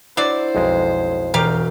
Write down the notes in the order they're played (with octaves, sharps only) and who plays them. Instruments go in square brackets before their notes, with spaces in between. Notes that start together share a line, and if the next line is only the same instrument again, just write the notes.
[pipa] F#3 D4 D5 [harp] E4 [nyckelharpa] C5
[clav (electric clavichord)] B1 F2 G#3
[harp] E1 G6 [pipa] G4 A#4 F5